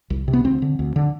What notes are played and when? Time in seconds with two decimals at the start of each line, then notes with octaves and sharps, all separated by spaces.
0.10 C2
0.28 C3
0.33 B3
0.44 D2 C4
0.62 D3
0.79 D2
0.96 D3